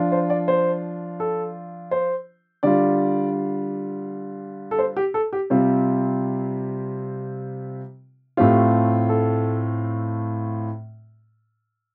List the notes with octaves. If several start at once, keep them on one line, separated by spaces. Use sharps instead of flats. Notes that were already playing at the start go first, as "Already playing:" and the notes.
Already playing: F3 D4 F4
C5
D5
C5
A4
C5
D3 G3 F4 D5
A4
C5
G4
A4
G4
C3 G3 C4 F4
A2 A3 C4 F4 G4
A4